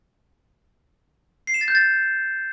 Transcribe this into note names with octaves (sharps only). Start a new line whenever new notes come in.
C7
E7
A6
G6
A6